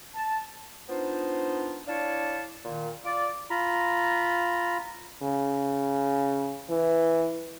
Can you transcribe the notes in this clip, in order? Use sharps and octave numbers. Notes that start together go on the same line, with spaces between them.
A5
B3 D4 D#4 F4 C5
D4 E4 C#5 D5 F5 A5
A#2 D#3
F4 D5 D6
F4 A#5 B5
C#3
E3